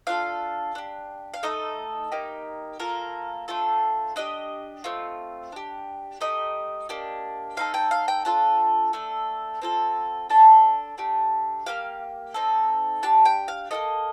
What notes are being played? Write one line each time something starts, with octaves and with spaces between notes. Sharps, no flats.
D4 F4 A4 F5
D4 G4
F5
A3 D#4 A4 D#5
A#3 D#4 G4
A#3 F4 A4 A#4
A3 D4 F4 A4
D4 G4 D#5
A3 C4 F4
D4 G4
A3 D#4 G4 D#5
A#3 D4 G4
C4 D#4 A4 F5
G5
F5
G5
D4 F4 A4 A5
A3 D4 A4
C4 F4 A4
D4 A4 A5
A3 D4 G4
A#3 D4 G4 F5
C4 D#4 A4
D4 G4 A5
G5
F5
A#3 F4 A4 D#5